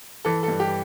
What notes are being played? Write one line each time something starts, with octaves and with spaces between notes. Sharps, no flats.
E3 A4
G2 A4
G4